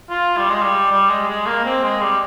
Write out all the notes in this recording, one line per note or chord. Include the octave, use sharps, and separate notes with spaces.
F4
G3
G#3
G3
G3
G#3
G#3
A#3
C4
G#3
G3